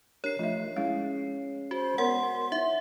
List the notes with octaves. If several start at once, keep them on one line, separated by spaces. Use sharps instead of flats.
D4 G4 A#4 C#5 C7
F3 A3 F4 D#5 E5
G#3 C#4 E4 G#4 F5
F#4 C5
B3 A#4 C#5 F#5 C6
D#4 E4 C#5 E5